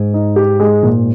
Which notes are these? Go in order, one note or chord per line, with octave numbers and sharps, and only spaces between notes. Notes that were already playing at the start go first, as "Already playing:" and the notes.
Already playing: G#2
D#4
G4
G#3
A#2